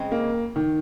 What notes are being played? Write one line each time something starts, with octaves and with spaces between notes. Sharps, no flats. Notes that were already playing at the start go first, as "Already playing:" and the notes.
Already playing: C#3 G#3 C4
A#3
D#3